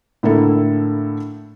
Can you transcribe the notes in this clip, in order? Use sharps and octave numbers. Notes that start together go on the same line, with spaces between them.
A2 D3 A#3 E4 A4